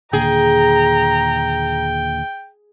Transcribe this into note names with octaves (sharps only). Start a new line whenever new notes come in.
D#2 A#2 D3 G#4 G5 A#5